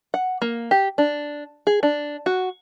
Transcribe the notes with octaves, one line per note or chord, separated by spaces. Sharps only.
F#5
A#3
G4
D4
G#4
D4
F#4